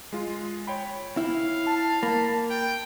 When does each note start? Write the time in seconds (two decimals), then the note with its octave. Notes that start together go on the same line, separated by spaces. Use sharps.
0.13 G#3 F4
0.67 C#5 G5 B5
1.17 E4 F5
1.67 A5
2.03 A#3 B5
2.51 G5